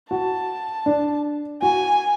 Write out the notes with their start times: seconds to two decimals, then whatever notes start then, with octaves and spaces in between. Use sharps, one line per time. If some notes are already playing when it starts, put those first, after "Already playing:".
0.11 F#4 A5
0.86 D4
1.62 F#4 G#5